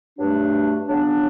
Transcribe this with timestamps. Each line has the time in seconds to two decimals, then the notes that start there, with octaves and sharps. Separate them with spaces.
0.18 G2 F#3 A3 D4
0.88 C#3 F#3 B3 D4